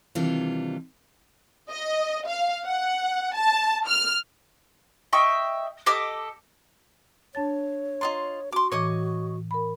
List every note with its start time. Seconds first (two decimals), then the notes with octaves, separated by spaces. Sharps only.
0.15 C3 D#3 E3 G3 D4 F4
1.70 D#5
2.27 F5
2.65 F#5
3.35 A5
3.88 F6
5.13 D#5 E5 G5 C#6
5.86 G4 A4 D#5 D6
7.35 D4 C#5 A5 A6
8.01 F4 D#5 A#5 C6 A6
8.52 F#4 C6 D6
8.72 A2 E3 C#5 D#5 D6 D#6
9.51 A#4 B5